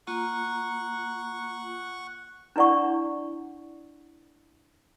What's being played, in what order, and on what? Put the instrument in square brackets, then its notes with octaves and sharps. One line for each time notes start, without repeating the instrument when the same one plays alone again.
[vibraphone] A#3 F4 A#5 [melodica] F#5 C#6
[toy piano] D4 E4 D5 F#5 C#6